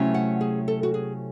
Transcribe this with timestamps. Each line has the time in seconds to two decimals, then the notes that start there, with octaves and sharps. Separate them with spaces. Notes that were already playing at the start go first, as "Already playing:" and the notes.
Already playing: C3 F#3 A3 C#4 E4
0.14 F#5
0.41 G#4
0.68 A4
0.83 F#4
0.94 G#4